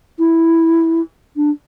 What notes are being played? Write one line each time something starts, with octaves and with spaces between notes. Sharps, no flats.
E4
D4